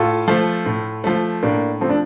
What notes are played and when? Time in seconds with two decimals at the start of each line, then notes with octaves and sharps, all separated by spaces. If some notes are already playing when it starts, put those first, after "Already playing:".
Already playing: A2 F4 A4
0.28 F3 A3
0.66 A2
1.04 F3 A3
1.43 A2 A#3 D4
1.81 F3 A3 C4
1.89 D4